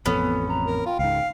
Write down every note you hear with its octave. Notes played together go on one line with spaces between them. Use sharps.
A1 F2 B3 C#4 A4
A#5
A#4
F4 G5
C#2 G#2 F5